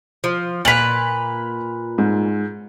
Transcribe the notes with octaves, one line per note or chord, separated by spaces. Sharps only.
F3
A#2 B4 B6 F7 F#7
G#2